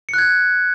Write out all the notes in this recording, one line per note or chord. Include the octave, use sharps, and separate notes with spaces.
F#6 G#6 C#7